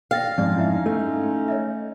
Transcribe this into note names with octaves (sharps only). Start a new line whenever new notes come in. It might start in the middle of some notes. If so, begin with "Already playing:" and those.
F5 G5 A6 A#6
F2 G#2 G#3 C#4 D#4 D5
E4 E5
A3
C#5 D#5 E5